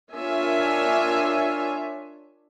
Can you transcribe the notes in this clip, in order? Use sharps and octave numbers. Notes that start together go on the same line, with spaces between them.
D4 F4 A#4 C#5 E5 G#5